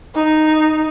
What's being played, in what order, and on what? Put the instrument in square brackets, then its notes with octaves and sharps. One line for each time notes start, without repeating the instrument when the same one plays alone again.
[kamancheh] D#4